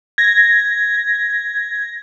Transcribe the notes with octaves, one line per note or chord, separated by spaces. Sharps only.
G#6 A#6